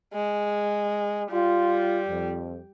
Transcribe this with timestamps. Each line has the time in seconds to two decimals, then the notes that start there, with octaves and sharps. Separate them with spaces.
0.13 G#3
1.31 G3 F4
2.09 F2